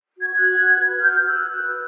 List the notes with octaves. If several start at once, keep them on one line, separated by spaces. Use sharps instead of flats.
F#4 G#6
F#6 G#6
F#4
F#4
B4
F#4 F6 G6
F#4
E6 F#6
F#4
E6 F#6
B4